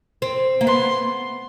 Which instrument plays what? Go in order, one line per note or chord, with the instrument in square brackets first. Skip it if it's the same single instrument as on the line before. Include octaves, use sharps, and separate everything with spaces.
[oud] C4
A#3
[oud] B3 [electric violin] C6